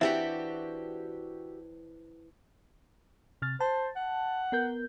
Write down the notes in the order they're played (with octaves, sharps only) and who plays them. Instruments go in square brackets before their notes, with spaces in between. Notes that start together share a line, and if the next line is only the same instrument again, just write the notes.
[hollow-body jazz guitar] E3 C4 D4 [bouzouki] F#4 G4 E5
[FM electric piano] C3 F6 A6
[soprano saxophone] C5 [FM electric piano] A5
[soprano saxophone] F#5
[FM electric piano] B3 A#4 G6